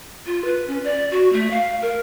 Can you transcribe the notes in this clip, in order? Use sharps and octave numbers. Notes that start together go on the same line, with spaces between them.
F4
B4
C#4
D5
F#4
A3
F5
A#4